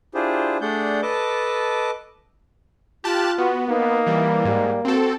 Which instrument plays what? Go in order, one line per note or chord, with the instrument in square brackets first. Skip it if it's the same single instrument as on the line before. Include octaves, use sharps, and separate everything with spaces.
[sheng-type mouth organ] D4 E4 F4 G4 G#4 C5
A3 D4 G#4 D5 F#5 G6
A4 B4 D#5 A5 D6
[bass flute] F4 [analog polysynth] G4 A5 F#6
[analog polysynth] B3 [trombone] F#4
[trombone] A#3 [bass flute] D#4
[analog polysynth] E3 G3
[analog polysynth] G#2 [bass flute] G3
[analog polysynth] C4 A4 [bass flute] F#4